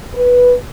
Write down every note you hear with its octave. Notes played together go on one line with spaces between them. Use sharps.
B4